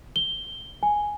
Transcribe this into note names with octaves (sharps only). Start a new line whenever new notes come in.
G7
G#5